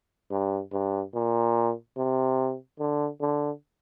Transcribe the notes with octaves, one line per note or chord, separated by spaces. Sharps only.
G2
G2
A#2
C3
D3
D3